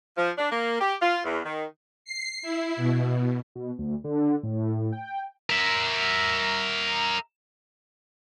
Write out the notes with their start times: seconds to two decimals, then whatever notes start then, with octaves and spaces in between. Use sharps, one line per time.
0.18 F3
0.38 D4
0.52 A#3
0.81 G4
1.01 F4
1.25 E2
1.45 D#3
2.05 C7
2.42 E4
2.76 B2
3.55 B2
3.78 D2
4.04 D3
4.43 A2
4.92 G5
5.50 A#4 E5